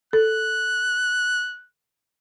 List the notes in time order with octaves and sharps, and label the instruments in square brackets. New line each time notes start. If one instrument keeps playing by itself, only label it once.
[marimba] A4 [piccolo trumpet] F#6